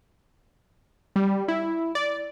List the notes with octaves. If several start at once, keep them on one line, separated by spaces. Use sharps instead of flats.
G3
E4
D5